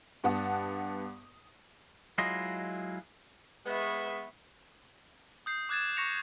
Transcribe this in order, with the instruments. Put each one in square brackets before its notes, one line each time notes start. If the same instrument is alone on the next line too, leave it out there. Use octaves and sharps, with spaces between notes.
[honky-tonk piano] G2 B3 F#5 A5 D#6
[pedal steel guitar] F#3 G#3 E4 F4 D#5
[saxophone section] G#3 B3 [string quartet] B4 E5 C#6
[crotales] D#6 G6 C7
D6 F#6 G#6 A6 E7
C#6 A#6 C#7 F7